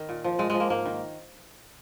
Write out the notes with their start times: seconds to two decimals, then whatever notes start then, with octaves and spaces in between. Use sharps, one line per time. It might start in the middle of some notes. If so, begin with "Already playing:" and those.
Already playing: D#3
0.09 A#2
0.24 F3
0.39 A#2 G#3
0.50 F3 G#3
0.60 A#3
0.70 G#2 A#3
0.85 D#3